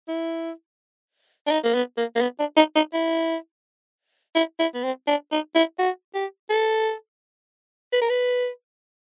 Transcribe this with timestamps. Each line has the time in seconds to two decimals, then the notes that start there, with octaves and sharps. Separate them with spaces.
0.08 E4
1.47 D4
1.51 D#4
1.64 A#3
1.75 B3
1.97 A#3
2.16 A#3
2.21 B3
2.39 D4
2.57 D#4
2.75 D#4
2.93 E4
4.35 E4
4.59 E4
4.74 B3
4.84 C4
5.07 D4
5.32 D#4
5.55 E4
5.79 F#4
6.14 G4
6.50 A4
7.93 B4
8.01 A#4
8.10 B4